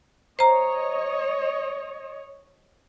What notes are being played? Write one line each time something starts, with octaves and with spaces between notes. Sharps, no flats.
C5 C#5 D#5 A#5